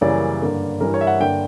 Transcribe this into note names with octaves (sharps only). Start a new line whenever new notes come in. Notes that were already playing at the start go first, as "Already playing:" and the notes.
F#2 C#3 E3 G3 A#3 D5
G2 D3 A#3
G2 E3 G3 A#4
C#5
E5
F#5
G2 D3 A#3 G5